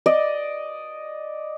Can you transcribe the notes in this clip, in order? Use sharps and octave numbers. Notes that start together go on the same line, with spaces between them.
D5 D#5